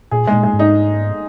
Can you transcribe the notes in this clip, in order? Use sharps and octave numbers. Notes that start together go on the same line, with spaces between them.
A#2 G#4
G#3
A#2
G#3
G#2
D#4